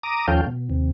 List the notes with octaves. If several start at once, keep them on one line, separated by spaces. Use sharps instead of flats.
A#5 D6 D#6
D#2 F3 C#4 A4 F5 G5
B2
D#2 C3